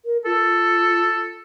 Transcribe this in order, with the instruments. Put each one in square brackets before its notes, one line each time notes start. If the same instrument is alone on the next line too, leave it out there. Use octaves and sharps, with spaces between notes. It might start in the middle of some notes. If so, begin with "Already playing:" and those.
[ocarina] A#4
[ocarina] F4 [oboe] A4